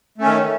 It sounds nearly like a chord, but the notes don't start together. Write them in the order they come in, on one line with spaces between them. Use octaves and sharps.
A3 C#4 D#3